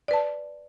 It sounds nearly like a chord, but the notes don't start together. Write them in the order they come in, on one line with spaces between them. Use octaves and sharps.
D5 B4 A5